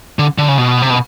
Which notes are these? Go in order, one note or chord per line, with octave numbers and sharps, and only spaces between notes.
D3
D3
C#3
B2
C3
B2